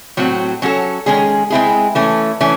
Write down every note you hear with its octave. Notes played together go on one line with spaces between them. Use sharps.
A2 F#3 C4 F#4
F#3 C#4 F#4 A4
D#3 G#3 C#4 G#4
G#3 C4 E4 G#4
E3 A3 C#4
E3 A3 C#4